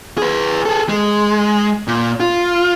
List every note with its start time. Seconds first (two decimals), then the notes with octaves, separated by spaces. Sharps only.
0.18 G#4 B4
0.65 G#4 A4
0.89 G#3
1.87 A#2
2.20 F4